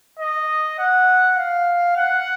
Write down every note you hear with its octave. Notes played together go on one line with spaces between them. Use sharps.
D#5
F#5
F5
F#5